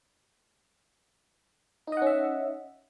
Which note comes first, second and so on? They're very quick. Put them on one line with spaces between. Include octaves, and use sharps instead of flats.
D#4 D#5 F#5 C#4 E5